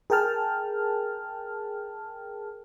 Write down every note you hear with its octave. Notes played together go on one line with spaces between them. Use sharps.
G#4 A#4 G5 A5 F6